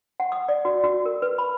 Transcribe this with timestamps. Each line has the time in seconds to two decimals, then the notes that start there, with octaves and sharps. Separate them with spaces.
0.20 F#5
0.32 D#6
0.48 D5
0.65 F#4
0.84 F#4
1.05 A#4
1.22 B4
1.38 B5